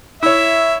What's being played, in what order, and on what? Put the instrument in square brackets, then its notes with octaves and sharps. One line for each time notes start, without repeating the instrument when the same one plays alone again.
[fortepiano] E4 C#5 [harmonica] E5